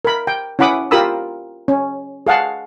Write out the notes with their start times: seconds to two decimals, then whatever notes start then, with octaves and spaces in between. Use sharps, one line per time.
0.05 A#4 B5
0.27 G5
0.59 C#4 E4 F#5 B5 D6 D#6
0.91 F4 G4 A#4 B5 D#6 E6
1.68 C#4
2.27 G#4 F5 F#5 A5